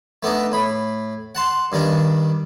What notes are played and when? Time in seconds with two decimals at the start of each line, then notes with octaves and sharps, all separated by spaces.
0.23 A3 B3 D4 D#4
0.52 A2 B5
1.35 F#5 A5 C6
1.72 G2 D#3 G3 D4